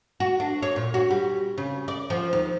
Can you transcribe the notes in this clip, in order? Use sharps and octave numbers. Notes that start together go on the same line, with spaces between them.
F#4
D4
C#5
A#2
F#4
G3
C#3
D5
F3
D#2